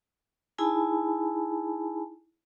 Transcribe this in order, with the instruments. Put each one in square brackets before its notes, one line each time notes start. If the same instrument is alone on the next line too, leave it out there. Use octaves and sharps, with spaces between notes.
[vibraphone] D#4 E4 G#4 G#5 A5 B5